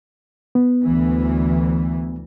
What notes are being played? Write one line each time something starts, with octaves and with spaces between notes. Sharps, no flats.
B3
D2 E3